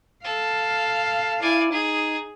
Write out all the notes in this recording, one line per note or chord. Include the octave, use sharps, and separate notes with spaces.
A4 F5
E4 D5 G#5
D#4 G#4